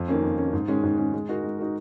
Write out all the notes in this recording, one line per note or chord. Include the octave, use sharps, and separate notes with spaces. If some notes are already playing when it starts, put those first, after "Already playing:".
Already playing: F2
D#3 A#3 C#4
F2
D#3 A#3 C#4
G#2
D#3 G#3 C#4
G#2
D#3 G#3 C#4
G#3
D#4 F#4 A#4
G#3
D#4 F#4 A#4